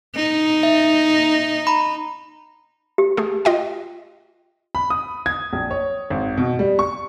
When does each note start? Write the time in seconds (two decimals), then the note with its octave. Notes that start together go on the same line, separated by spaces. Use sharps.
0.16 D#4
0.63 E5
1.67 A#5 B5
2.98 G4
3.17 A3 G#4
3.45 F4 D#5 G5
4.75 B5
4.90 D#6
5.26 G#6
5.53 A#1
5.71 C#5
6.10 G#1
6.37 B2
6.59 G3
6.79 C#6